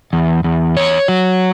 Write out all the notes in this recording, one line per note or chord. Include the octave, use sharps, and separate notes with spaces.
E2
E2
C#5
F#3